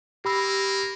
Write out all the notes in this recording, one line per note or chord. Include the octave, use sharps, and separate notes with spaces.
A#3 G4 B5 E6